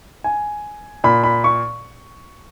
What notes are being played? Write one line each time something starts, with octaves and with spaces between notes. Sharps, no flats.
G#5
A#2 B5
B5
C#6